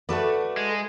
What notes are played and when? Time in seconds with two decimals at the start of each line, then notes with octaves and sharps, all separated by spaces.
0.09 A3 F#4 A4 B4 D5
0.57 G#3